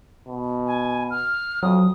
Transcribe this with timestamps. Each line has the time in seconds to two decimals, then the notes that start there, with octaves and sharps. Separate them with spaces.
0.28 B2
0.67 G#5
1.10 F6
1.63 F2 F#3 D#6